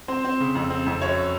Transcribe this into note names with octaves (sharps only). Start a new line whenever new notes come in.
C4 C5
C4
C#3
F2
C4
F2
F#2 C#5